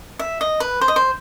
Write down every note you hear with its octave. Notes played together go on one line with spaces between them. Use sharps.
E5
D#5
B4
C5
D#5
C5